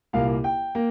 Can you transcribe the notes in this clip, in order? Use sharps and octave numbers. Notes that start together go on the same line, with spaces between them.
C2 A#2 A#3 F5
G5
A#3